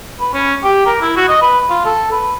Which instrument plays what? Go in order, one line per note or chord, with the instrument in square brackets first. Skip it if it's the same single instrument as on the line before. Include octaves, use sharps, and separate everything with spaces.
[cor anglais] B4
C#4
G4
A#4
E4
F#4
D#5
B4
F4
A4
B4